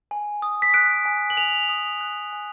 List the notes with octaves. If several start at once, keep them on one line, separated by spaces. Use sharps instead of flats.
G#5
D#6
B6
F#6 D7
G#5
F#7
G#5 F7
D#6
F#6
G#5